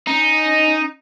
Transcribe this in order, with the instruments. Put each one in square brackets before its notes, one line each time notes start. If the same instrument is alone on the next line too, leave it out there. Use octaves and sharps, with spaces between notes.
[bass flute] C#4 [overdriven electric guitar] D#4